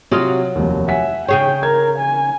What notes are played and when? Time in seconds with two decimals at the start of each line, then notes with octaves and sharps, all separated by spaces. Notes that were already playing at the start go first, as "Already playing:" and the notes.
0.11 C3 F#3 F4 F#4 D#6
0.55 F1 D#2
0.88 E5 F#5 G#5 B6
1.28 C#3 G#4 C#5 G5
1.63 A#4 G#6
1.99 G#5